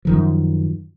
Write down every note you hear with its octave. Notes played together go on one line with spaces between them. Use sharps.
F#2 D#3 F3